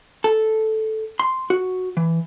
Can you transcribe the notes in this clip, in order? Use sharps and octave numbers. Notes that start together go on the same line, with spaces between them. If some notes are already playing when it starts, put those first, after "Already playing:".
A4
C6
F#4
E3